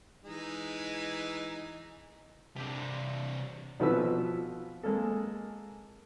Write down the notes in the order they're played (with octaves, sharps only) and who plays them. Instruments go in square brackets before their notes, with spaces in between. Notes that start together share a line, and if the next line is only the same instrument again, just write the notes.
[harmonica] E3 G#3 D#4
[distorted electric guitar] C3 D4
[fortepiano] B2 F3 B4 E6
G#3 A#3 A4